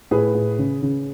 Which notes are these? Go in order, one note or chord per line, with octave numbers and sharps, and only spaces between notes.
A2 G#4 B4
A2
C#3
C#3